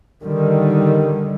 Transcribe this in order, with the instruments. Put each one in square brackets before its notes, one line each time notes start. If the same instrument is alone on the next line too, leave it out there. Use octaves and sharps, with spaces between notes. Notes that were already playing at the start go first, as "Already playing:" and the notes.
[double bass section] D3 D#3 G3